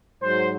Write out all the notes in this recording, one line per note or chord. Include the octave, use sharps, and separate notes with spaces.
G#2 F#3 C5